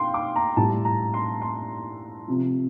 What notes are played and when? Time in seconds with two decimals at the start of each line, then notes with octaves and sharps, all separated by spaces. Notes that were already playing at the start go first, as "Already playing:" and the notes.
Already playing: F5 G5 C6
0.14 D6
0.36 A#5
0.56 A2 E3 G3 A5
0.85 A#5
1.14 C6
1.42 C6
2.28 C3 F3